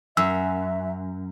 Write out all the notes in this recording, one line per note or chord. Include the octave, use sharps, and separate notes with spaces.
F#2 E5 E6